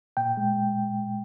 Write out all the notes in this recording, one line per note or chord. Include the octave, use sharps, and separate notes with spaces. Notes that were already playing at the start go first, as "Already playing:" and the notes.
A#2 G5
G#3